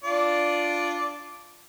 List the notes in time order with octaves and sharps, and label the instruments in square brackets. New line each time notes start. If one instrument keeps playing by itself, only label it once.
[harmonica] D4 F4 D5